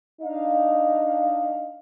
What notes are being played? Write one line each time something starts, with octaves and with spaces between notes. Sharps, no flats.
D4 D#4 D#5 F5